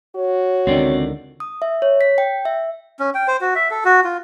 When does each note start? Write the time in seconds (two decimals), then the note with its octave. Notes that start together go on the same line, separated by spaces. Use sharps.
0.16 F#4 C#5
0.67 C#2 D3 D#3 C4 D5
1.40 D#6
1.62 E5
1.82 C#5
2.01 B6
2.18 G5
2.45 E5
2.99 C#4
3.15 G5
3.28 C5
3.41 F#4
3.55 E5
3.71 A4
3.85 F#4
4.04 F4